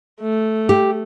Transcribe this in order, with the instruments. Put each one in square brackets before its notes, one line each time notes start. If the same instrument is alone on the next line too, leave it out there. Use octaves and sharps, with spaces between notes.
[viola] A3
[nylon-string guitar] G4